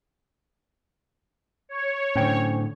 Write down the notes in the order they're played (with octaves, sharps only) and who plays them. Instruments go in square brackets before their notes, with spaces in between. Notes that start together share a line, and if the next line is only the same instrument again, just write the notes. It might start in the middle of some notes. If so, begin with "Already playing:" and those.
[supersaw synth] C#5
[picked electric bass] A2 D3 [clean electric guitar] C#4 C5 G5